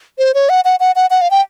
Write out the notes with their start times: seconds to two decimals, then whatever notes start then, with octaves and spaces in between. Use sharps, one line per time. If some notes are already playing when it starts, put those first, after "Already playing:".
0.18 C5
0.34 C#5
0.49 F#5
0.65 F#5
0.80 F#5
0.96 F#5
1.10 F#5
1.21 F5
1.31 G5